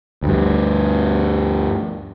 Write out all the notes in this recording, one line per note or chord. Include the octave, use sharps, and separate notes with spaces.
D2 G2